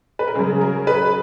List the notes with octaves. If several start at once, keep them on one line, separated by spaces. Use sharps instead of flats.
B4
A#4
C#3 F#3 G#4
A#4
B4